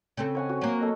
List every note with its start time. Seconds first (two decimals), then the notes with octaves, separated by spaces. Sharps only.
0.17 C#3 C4 A4
0.35 C#5 F#5 G#5
0.49 F#4
0.62 F#3 A#3
0.80 A4 D#5